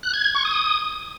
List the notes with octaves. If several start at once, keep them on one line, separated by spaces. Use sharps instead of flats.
F#6
G#6
G#6
C#6
D#6